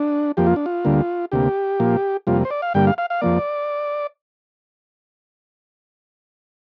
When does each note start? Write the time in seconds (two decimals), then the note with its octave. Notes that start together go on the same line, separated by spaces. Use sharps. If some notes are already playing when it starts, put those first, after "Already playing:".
Already playing: D4
0.37 F2 F3 A#3 G4
0.47 F4
0.56 D4
0.66 F4
0.85 D2 D3 G3 A#3
1.32 D2 C3 A#3 G4
1.80 A#2 F3 A#3
2.27 F2 C3 G3 A#3 F4
2.45 C5
2.51 D5
2.62 F5
2.74 G2 D3 G3 A#3 G5
2.87 F5
2.98 F5
3.10 F5
3.21 F2 F3 A#3 D5